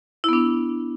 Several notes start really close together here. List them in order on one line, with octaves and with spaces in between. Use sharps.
E4 B3 D4